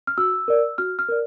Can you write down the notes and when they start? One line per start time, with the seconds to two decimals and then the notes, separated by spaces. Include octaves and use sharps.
0.07 F6
0.18 F#4 E6
0.48 A#4 D5
0.78 F#4 F6
0.99 F6
1.09 A#4 D5